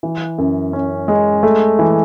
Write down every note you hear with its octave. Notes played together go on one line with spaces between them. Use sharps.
E3
F#2
C#4
G#3
A3
E3